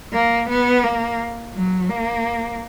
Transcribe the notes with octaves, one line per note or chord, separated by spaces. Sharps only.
A#3
B3
A#3
F#3
A#3